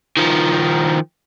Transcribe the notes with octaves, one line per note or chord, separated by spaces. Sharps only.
D#3 F3